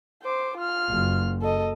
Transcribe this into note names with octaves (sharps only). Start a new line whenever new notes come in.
C5 D6
F4 F6
F#1
A4 D#5